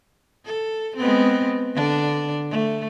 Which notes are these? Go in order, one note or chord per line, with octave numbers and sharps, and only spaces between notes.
A4
G#3 B3 C4
D3 D4
A3